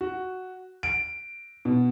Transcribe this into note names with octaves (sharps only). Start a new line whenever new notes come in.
F#4
D7
B2